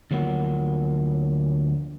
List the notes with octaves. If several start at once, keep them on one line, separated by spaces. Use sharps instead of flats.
D2 F3 F#3 A#3 F#5